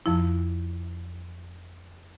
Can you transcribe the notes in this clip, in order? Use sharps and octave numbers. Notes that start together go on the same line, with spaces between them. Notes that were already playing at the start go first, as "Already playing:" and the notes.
F2 F3 E4